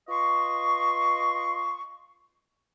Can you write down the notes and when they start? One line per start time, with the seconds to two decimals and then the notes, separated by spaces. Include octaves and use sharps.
0.09 F4 B4 D#5 C6 C#6